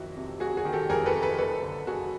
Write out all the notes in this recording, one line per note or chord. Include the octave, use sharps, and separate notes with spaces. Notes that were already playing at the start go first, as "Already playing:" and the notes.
Already playing: F2 D#3 F#3 E4 F#4
C3
F#3 F#4 G#4
F#4 G#4
D#3
G4 A4
F2 G#4 A#4
A4 B4
C3
A4 B4
F#1 A4 B4
D3
F#1 F#4 G#4